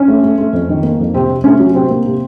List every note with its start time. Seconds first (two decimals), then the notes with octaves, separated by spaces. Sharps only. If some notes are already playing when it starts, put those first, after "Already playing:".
Already playing: C#4
0.08 A3
0.23 A3
0.38 A3
0.53 F2
0.69 D#3
0.83 A#3
0.99 F2
1.14 C3 C4
1.29 C3
1.44 A3 C#4
1.60 F#3
1.74 C3 C4
1.90 A#3
2.05 C3